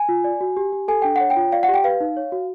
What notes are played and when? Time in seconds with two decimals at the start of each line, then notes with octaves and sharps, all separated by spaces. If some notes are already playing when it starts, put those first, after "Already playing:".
Already playing: G#5
0.09 F4
0.24 D5
0.41 F#4
0.57 G4
0.72 G4
0.88 A4 G#5
1.02 D4 G5
1.16 C#5 F#5
1.30 G5
1.36 F4
1.52 D5 F5
1.63 F#5
1.68 G4
1.74 G5
1.84 B4 F5
2.01 D#4
2.17 C#5
2.32 F#4